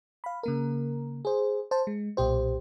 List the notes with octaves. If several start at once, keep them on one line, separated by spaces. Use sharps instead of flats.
F5 B5
C#3 A#3 A#4
G#4 C5
C5 A5
G#3
B1 A#2 G4 C5